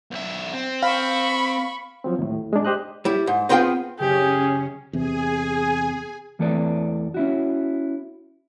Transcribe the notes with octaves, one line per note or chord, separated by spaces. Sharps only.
B1 E5
C4
F5 B5 C#6
F3 F#3 C4
D#2 A2
G#3 D4
G4 C5 D#5 F#6
G3 E4
G#2
B3 C4 E4 F4 G#4 G5
F#1 C#3 C#4 G4 G#4
E2 C3 G#4 G#5
E2 E3 A3 A4 B4 D5
C#4 E4 F#4